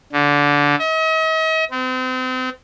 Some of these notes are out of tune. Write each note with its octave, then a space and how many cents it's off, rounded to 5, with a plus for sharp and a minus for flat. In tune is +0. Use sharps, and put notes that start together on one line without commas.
D3 -20
D#5 +45
C4 -35